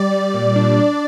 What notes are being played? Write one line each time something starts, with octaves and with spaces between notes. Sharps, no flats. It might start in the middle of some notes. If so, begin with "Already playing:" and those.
Already playing: G3 D5
G3
A#2
D4
D4